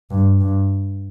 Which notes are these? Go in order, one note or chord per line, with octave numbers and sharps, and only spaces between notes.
G2
G2